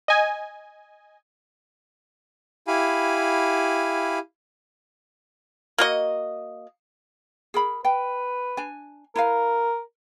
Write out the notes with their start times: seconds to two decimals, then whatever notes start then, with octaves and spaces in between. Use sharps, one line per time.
0.08 D#5 G#5
2.67 E4 G4 F5 G#5 B5
5.78 A#3 F#4 D#5
7.54 G#4 A#4 B5
7.85 B4 G5
8.57 D4 G#5
9.16 E4 A#4 B4 F5